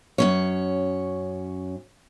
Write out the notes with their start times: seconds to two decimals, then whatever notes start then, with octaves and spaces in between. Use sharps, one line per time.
0.18 F#2 C#4 C#5